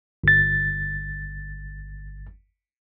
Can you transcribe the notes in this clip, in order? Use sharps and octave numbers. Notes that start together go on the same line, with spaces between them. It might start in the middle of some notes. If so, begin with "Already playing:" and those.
G1 A6